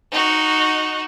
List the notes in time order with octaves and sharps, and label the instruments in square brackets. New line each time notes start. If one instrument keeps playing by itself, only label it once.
[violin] D#4 F#4